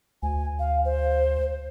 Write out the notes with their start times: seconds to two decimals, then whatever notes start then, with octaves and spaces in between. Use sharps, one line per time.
0.23 D2 G#5
0.59 F5
0.85 C5